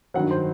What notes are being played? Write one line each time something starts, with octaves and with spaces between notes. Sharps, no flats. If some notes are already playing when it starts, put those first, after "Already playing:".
G2 D#3 F#3 F#5
C5